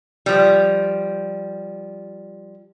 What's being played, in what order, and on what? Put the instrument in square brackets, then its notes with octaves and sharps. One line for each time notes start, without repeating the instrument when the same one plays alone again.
[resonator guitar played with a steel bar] F3 G3